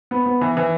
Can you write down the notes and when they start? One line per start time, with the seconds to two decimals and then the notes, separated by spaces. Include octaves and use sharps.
0.11 B3
0.26 B3
0.41 E3
0.57 E3